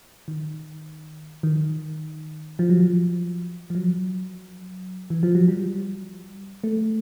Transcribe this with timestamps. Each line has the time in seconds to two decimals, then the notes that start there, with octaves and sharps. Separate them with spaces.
0.28 D#3
1.43 D#3
2.59 F3
2.70 F#3
2.80 F3
3.70 F3
3.75 F#3
5.10 E3
5.23 F3
5.35 F#3
5.48 G3
6.64 A3